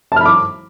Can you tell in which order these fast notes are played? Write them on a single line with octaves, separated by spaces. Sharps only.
A5 F6 B5 D6